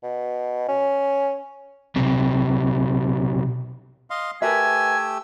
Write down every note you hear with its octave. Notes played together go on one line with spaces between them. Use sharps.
B2
C#4
B1 C3
D#5 F5 C6
A3 G4 A#4 B4 E5 G#5 E6